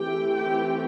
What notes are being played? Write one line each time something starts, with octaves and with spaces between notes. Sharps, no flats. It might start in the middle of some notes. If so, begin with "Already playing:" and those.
Already playing: E3 A3 C4 G4 G5
G4 G5